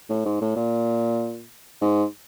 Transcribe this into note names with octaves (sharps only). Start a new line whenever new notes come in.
A2
G#2
A2
A#2
G#2